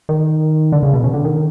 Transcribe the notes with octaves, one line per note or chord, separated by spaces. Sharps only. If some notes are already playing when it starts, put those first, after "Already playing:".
D#3
D3
C#3
B2
C#3
D3
D#3